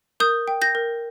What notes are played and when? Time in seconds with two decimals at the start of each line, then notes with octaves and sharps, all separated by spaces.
0.20 A#4 D#6 G6
0.48 G5
0.62 G6 A#6
0.75 A#4